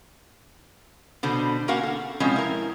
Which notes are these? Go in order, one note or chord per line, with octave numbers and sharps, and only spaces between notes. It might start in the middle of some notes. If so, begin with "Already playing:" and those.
B2 D3 C5
A#3 C#4 F#4 A#4 F5 F#5
A4
B2 F3 G#3 C4 C#4 B4
E4 A#4